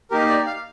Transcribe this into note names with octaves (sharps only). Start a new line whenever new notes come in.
A#3 D#4 G4 A#4
D5
F5